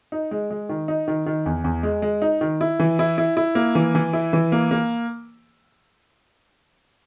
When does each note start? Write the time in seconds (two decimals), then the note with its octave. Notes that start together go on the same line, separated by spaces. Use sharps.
0.12 D#4
0.31 G#3
0.50 G#3
0.69 D#3
0.88 D#4
1.08 D#3
1.26 D#3
1.46 E2
1.64 E2
1.83 G#3
2.02 G#3
2.22 D#4
2.41 D#3
2.61 E4
2.79 E3
2.99 E4
3.18 E4
3.37 E4
3.55 A#3
3.75 E3
3.95 E3
4.13 E4
4.33 E3
4.52 A#3
4.71 A#3